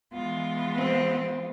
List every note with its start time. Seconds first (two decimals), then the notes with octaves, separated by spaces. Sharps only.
0.11 E3 G#3 B3 F4
0.76 C4